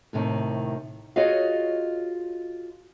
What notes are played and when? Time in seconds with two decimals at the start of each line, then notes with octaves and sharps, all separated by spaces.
0.13 D#2 A2 C3 D#3
1.16 F4 F#4 G#4 C#5 D#5 F5